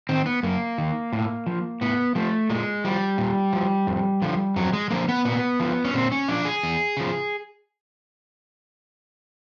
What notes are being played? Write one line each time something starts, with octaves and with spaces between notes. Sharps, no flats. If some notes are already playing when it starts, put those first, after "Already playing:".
D#3 C4
B3
F#2 A#3
D#3
A2
F3
A2 B3
F3 A3
A#2 G#3
F3 G3
A#2
F3
F2
D3 F3
F2 F#3
G#3
D3 F3 A#3
B3
A#2 B3
F3
C#4
A#2 C4
C#4
F3 D4
G#4
E2
C#3 F3